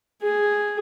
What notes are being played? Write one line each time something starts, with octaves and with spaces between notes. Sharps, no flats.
G#4